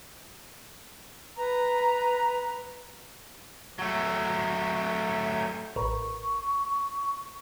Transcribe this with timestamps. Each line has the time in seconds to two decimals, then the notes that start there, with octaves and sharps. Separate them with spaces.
1.36 B4 A#5
3.79 F#3 A3
5.76 A1 A#4 B4 C#6